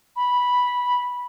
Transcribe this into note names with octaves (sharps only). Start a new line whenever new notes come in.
B5